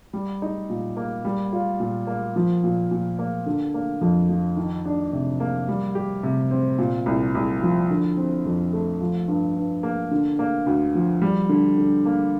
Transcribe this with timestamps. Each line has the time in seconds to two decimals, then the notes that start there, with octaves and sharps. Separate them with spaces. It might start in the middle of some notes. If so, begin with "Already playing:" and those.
0.13 G3
0.42 D#4
0.69 A#2
0.97 A#3
1.25 G3
1.53 F4
1.80 A#2
2.07 A#3
2.36 F3
2.64 A#2
2.91 A#2
3.19 A#3
3.46 D3
3.74 A#3
4.01 F2
4.29 F3
4.57 D#3
4.85 D4
5.13 C3
5.40 A#3
5.68 G3
5.95 G4
6.23 C3
6.51 C4
6.78 A#2
7.06 C2
7.35 C2
7.62 F3
7.90 D3
8.17 C4
8.45 F2
8.73 A3
9.00 F3
9.28 G2
9.56 G2
9.83 A#3
10.11 D3
10.39 A#3
10.66 D2
10.95 F3
11.22 G3
11.49 D3
11.78 D3
12.06 A#3